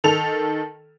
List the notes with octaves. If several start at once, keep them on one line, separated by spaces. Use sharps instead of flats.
D#3 A4 F7